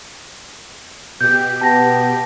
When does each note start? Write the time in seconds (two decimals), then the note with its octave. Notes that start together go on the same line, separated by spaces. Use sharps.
1.21 B2 G4 G6
1.61 B3 A5 A#6